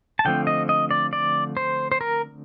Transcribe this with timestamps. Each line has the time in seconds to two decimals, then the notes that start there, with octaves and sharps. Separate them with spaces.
0.19 A5
0.25 D3 F3 A3 C4 G5
0.47 D#5
0.69 D#5
0.91 D5
1.13 D5
1.57 C5
1.92 C5
2.01 A#4